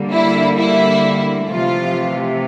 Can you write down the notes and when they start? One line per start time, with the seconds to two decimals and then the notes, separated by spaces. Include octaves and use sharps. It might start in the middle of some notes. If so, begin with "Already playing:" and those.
Already playing: D3 G3 A#3
0.12 E4
0.57 E4
1.49 C3 E3 F3 A3 F4